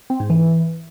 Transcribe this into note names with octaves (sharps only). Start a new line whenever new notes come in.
C4
G#2
E3